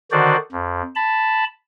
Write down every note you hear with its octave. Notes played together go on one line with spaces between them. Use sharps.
D3 D#3 F#4 C5 D5
F2
A5 B5